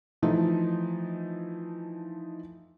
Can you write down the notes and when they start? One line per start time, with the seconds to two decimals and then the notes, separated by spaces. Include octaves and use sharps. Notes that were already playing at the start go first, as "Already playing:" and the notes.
0.22 E3 F3 A3 D#4